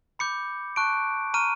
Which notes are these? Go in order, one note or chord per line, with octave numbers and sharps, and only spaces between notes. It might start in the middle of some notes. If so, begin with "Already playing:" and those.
B5 D6 G6 C#7
A5 C#6 F#6 D7
A#5 C#6 F6 D#7